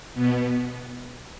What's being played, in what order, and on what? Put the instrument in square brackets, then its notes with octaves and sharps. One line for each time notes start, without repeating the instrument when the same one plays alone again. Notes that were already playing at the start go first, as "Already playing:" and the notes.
[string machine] B2 B3